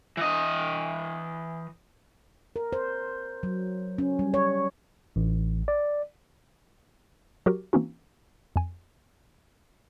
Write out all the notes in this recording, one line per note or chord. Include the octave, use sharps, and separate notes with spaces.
E3 D#5
A#4
C5
F#3
C#4
G3
C#5
A1
D5
F#3 F#4 G4 A#4
E3 A#3 C4 C#4 D#4 F#4
F2 G#5